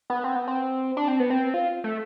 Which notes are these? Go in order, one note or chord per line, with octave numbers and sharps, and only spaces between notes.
B3
C4
B3
C4
D4
C4
B3
C4
F4
A3